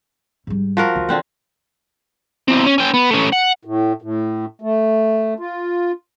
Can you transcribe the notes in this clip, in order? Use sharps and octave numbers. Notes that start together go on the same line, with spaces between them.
G#2 G3
F3 F#4 A#4
D2
D3 E3 C4 F#5
E2 C4
C#4
C#4 G5
B3
A3 C#4
F#5
A2
A2
A3
F4